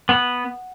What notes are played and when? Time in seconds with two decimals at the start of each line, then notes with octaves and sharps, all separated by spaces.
0.09 B3 F#5